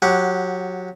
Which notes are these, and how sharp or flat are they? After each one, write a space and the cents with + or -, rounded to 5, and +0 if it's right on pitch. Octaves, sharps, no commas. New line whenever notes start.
F#3 -20 G4 -10 F#5 +0